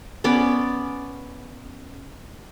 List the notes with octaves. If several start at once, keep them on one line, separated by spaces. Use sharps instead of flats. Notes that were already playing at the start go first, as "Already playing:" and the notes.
B3 C#4 D5 B5